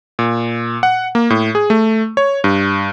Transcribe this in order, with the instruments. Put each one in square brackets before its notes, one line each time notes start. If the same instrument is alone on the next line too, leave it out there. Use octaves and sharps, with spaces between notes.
[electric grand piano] A#2
F#5
A#3
A2
G#4
A3
C#5
G2